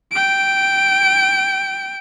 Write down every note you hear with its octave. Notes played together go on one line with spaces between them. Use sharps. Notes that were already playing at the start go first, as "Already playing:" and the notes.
G5 D7